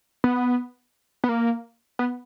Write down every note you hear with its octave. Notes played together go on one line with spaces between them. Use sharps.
B3
B3
A#3
B3